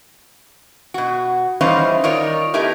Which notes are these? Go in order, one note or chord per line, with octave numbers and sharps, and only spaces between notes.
B2 F#4
E3 G3 C#4 D#4 C5 F5
D#3 D#4 F4 A#4 C#5 D5
A3 B3 D#4 E4 G4 A#4